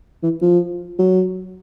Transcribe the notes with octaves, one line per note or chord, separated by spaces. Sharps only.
E3
F3
F#3